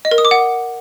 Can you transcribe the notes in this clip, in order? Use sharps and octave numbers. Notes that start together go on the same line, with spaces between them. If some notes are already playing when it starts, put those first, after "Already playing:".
D#5
A#4
D#6
D6
F#5